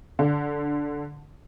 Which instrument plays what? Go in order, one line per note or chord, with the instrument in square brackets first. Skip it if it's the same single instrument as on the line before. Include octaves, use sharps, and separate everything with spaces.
[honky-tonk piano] D3